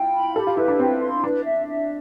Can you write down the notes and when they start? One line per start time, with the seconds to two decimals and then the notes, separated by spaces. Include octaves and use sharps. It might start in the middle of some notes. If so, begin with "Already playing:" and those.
Already playing: E4 F4 G5
0.13 B5
0.36 G4 A4
0.47 F4
0.57 E4 B4
0.68 D4
0.79 C4 G5
1.01 C6
1.24 D4 B4
1.45 E5
1.67 E5